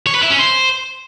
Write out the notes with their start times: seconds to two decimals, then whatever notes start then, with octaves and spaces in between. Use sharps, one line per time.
0.07 C#5
0.15 B4
0.23 E4
0.31 C#4
0.38 C5